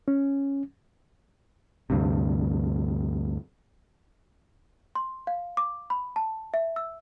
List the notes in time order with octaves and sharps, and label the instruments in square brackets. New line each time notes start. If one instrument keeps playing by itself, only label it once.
[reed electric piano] C#4
[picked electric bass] D2 G2 C3
[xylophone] C6
F5
D6
B5
A5
E5
E6